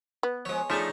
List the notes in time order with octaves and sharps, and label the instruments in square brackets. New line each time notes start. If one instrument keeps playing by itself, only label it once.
[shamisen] B3
[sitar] F3 G#3 [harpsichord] C#5 D#6
[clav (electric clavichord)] F3 A3 E5 [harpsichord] D4 G#4 C#5 [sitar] D#4